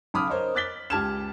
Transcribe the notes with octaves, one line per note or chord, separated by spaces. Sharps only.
B1 C#3 B5 D6 D#6 F6
A#4 C5 C#5 D#5
D6 F#6 A6 B6 G7
C#2 G4 A5 F6 G#6 E7